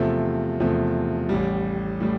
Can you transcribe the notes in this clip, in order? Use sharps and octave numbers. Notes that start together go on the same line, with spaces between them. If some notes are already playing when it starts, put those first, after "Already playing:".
Already playing: E2 C3 F3 A3
E2 C3 F3 A3
A1 A2 G3
A2 G3